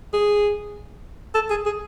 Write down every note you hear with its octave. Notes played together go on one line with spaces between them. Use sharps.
G#4
A4
G#4
G#4